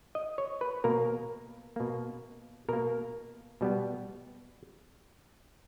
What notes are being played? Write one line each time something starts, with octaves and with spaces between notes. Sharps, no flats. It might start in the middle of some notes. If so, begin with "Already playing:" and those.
D#5
C#5
B4
B2 A#3 A#4
B2 A#3
B2 A#3 A#4
B2 G3 B3